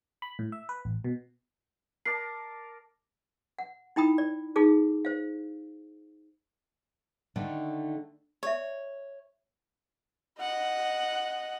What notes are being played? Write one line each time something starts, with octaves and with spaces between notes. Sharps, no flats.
B5
A2
E5
B4
A1
B2
A#4 D5 A5 C7
F#5
D#4 E4 G5 A#5 B5 D#6
D5
D#4 F4 G#4 A4 D6
C5 F5
D3 D#3 A3 D4 D#4
C#5 D5 E5
D#5 F#5